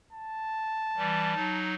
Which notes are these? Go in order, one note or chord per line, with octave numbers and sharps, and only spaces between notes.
A5
E3 G3
F#3 D#4